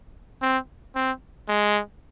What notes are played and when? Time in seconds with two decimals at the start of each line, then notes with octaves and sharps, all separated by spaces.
0.42 C4
0.95 C4
1.48 G#3